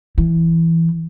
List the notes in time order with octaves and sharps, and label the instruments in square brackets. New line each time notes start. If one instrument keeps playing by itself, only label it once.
[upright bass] E3